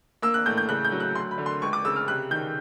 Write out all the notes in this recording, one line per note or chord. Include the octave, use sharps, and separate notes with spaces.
A#3 E6
F#6
A2 G6
G6
C#3 F#6
G6
F#3
F#6
D2 C6
B5
D3
C6
C#2 C#6
D6
C#3 E6
F6
C3 F#6
D#3 G6